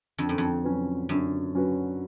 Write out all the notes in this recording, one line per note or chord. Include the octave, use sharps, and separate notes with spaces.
F2 D3
F#2
F2
F#3 C#4 F#4 B4
F#2 D3
F#3 C#4 F#4 B4